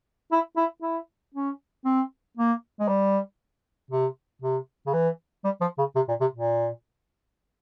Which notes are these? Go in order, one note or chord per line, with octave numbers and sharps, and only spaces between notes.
E4
E4
E4
C#4
C4
A#3
G#3
G3
C3
C3
C#3
E3
G3
F3
C#3
C3
A#2
C3
A#2